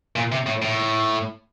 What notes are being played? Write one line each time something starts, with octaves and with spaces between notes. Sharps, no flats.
A#2
C3
A2
A2